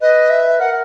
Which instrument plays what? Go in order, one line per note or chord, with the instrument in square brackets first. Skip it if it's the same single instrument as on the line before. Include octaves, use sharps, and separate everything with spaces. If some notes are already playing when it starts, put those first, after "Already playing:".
[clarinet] B4 [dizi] D#5
[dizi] E5
[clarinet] A#4 [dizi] F#5